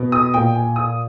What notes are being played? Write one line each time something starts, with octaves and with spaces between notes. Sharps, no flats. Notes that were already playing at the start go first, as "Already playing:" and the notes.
Already playing: B2
D#6
A#2 G5
G#5
D#6